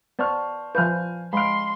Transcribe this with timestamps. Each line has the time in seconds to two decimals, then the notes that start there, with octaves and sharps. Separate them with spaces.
0.19 B3 C5 D5 A5 C#6 F6
0.75 F3 B4 F5 G#5 F6 G6
1.33 G#3 F5 B5 C6 F6 D7